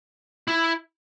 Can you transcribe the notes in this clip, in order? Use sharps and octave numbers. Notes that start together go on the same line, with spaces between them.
E4